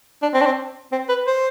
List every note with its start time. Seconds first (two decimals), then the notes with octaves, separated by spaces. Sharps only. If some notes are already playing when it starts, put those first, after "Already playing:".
0.22 D4
0.34 C4
0.42 D4
0.46 C4
0.92 C4
1.09 B4
1.27 C5